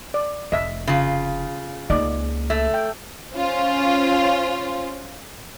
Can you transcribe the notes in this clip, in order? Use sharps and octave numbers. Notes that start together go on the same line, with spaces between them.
D5
F1 D#5 E5
C#3 F4
C#2 A#3 D#4 D5 D#5
A3 E5
G5
C#4 F4 C5